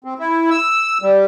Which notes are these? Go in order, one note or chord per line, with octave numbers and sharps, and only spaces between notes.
C4
E4
E6
G3